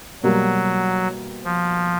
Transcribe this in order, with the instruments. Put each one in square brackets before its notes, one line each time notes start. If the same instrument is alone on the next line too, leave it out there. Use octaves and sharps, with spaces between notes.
[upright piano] B2 G3 A#3 [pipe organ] F#3
[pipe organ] F3